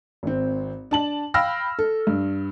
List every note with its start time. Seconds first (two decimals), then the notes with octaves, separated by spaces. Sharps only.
0.23 G#1 C4
0.91 D4 A5 F#7
1.34 F5 G5 B5 E6 F6 A#6
1.79 A4
2.07 G2